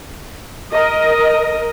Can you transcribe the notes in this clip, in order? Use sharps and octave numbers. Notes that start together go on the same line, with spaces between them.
A#4 D#5